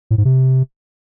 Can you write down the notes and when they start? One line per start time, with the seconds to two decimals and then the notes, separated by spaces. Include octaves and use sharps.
0.11 A2
0.18 G#2
0.25 C3